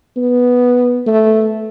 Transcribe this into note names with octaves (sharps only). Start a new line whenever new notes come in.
B3
A3